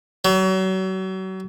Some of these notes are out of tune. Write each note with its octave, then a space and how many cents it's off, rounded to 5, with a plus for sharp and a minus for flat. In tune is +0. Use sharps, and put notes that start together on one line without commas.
F#3 +35